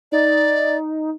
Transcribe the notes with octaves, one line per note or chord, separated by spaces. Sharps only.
D#4 D5